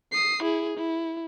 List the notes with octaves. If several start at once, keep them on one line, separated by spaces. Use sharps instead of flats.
D#6 C7
E4 G#4
E4